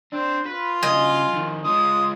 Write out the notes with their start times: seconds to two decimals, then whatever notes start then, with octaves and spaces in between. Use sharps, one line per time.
0.13 C4 D4
0.46 F4 B4
0.83 G2 C#3 D#5 G#5
1.33 F2 D#3
1.65 G#3 F4 D#6